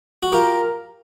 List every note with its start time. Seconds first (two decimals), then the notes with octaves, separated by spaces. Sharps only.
0.23 F#4
0.32 F4 G4 A#4